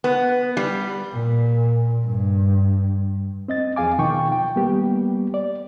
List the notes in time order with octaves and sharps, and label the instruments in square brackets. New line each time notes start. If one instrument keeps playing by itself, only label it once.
[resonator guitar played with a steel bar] B3
G3
[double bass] A#2
G2
[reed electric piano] C4 D#5 A6
E2 F3 G#4 F5 G#5 D6
B2 D#3 F3 G5 C#6
G5
G3 A#3 B3 G4
D5